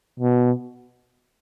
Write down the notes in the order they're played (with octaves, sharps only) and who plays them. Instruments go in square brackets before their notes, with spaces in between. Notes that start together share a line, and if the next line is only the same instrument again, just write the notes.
[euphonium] B2